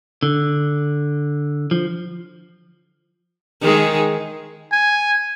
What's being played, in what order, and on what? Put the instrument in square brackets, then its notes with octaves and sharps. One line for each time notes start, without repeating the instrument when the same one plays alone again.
[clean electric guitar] D3
F3
[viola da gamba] D#3 G#3 G#4
[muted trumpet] G#5